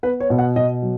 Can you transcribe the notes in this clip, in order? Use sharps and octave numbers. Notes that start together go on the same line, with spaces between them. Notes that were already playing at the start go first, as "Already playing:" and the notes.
B3 B4
C#5
B2
F#5
B2 D#5
F#3